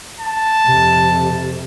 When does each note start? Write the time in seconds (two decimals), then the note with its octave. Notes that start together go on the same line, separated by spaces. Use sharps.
0.20 A5
0.66 F2 C3